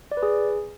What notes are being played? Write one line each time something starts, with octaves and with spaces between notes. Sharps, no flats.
D5
B4
G#4